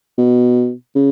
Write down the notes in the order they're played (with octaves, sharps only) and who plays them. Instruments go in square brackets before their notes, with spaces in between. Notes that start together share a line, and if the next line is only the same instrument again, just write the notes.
[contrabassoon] B2
C#3